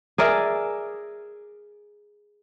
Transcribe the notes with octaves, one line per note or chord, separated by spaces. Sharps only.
G#4 A#4 D5 E5